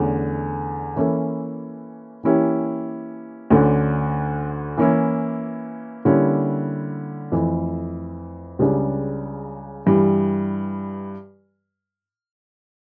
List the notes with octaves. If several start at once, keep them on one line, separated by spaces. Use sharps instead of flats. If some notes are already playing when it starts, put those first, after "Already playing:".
Already playing: E2 D3 A3 C#4
E3 A#3 C#4 E4 A4
E3 A#3 C#4 E4 G4
D2 D3 A3 C#4
E3 A#3 C#4 E4
D3 G3 A#3 C#4 E4
F2 E3 A3
C#2 C#3 G3 D4
G2 E3 G3